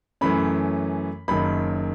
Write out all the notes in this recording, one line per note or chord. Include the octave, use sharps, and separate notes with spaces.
F#2 E3 A3 C#4 B5
F#1 F#2 D#3 B5